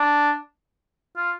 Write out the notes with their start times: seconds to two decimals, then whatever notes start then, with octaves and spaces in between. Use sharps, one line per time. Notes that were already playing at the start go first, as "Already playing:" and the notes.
Already playing: D4
1.17 F4